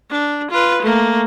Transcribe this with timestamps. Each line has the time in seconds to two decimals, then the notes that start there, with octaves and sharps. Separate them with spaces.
0.11 D4
0.51 F4 B4
0.82 A3 A#3